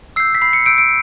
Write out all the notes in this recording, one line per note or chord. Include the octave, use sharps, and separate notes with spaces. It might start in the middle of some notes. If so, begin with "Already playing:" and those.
E6 G6 C7
B6
B5 C7
C#7
E6 G6 D7
D7